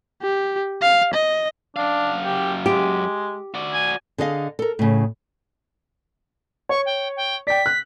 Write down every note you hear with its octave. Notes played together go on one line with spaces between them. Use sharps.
G4
F5
D#5
F#2 D4 F5
G4
G#3 G4
F#4 D5
G#5
D3 G#4 D#5 F5
A4 A#4
A2 C#3
C#5 C#6
G5
G5
D5 G5 B6
F#6